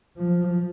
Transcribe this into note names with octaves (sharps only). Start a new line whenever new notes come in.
F3